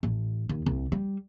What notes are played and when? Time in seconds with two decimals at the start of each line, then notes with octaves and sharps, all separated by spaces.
0.03 A1
0.49 D#2
0.66 C2
0.92 G3